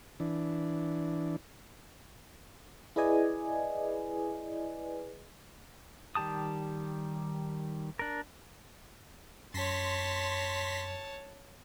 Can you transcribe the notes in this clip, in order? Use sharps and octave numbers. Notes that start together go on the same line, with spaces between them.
E3 D4
E4 G#4 B4 D5 D#5 G#5
D#3 G3 G4 A5 D#6
D4 A#4
F#2 C#5 A5 C6 A#6 B6